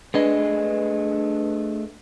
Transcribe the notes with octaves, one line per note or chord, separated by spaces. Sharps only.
A3 D4 G#4 B4 D#5